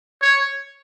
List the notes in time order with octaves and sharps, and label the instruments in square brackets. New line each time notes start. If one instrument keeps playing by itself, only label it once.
[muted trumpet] C#5